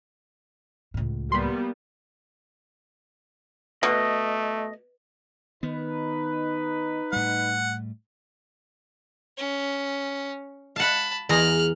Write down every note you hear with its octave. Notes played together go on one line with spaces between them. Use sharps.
C#2 A2
G3 A#3 B3 B5 C6
B2 A3 D#5
D#3 B3 D#4 B4
A2 G3 F#5
C#4
F5 F#5 A5 B5
E2 G#4 A#5 F6 F#6